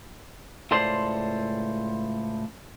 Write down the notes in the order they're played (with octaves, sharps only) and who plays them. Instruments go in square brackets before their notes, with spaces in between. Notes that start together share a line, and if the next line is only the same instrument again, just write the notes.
[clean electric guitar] C#2 A2 A4 C5 D5 C6